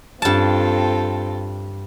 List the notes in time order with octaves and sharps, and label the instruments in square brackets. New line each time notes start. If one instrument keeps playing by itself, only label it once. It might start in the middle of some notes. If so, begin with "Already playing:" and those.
[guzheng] G2 A5 [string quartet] C4 F4 A4